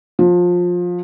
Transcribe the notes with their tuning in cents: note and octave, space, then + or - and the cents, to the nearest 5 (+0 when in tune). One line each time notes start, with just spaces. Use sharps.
F3 +20